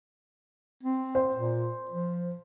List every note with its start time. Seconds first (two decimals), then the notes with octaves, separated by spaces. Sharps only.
0.83 C4
1.15 C5
1.35 A#2
1.91 F3